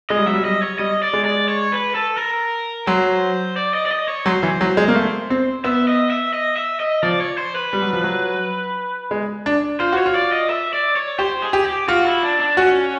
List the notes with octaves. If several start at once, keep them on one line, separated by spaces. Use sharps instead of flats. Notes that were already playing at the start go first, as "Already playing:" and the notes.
G#3 D#5
G3
F#3 E5
G3
G3 D#5
C#5
G3 D#5
D5
G#3
D5
C#5
B4
A4
A#4
F#3 C5
D5
D#5
D5
D#5
C#5
F#3 C5
E3
F#3
G#3
A#3
A3
C4
B3 E5
D#5
E5
D#5
E5
D#5
F3 D5
C#5
C5
B4
G3
F#3
F3
F#3
G#3
D4
F4 C5
F#4
C#5
F4
D5
D#5
E5
D5
C#5
G4 C5
G#4
G4
G4
F4 F#4
E4
D4
D4
C#4 F#4